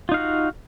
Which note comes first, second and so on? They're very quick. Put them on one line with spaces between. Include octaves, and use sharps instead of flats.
F4 D#4 F5 F#4